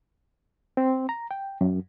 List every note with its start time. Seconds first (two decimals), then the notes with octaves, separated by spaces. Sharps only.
0.77 C4
1.09 A#5
1.31 G5
1.61 F#2